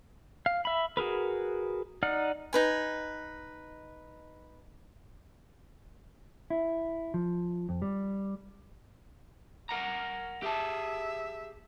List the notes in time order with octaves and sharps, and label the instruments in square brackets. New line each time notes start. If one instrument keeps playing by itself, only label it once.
[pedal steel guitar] F5
E5 B5
F#4 G#4 A#4 B4
D#4 D5 F#5 F6
[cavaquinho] D#4 B4 G#5
[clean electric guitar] E4
F3
F2
G3
A#4 F#5 A#5
[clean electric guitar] G4 G#4 A5 [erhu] E5